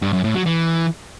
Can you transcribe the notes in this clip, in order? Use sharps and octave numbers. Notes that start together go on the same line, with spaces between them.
G2
F#2
A2
F#3
E3